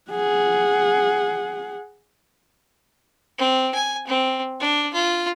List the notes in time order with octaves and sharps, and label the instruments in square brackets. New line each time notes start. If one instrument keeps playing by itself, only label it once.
[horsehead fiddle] G#4 F#5
[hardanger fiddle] C4
G#5
C4
D4
F4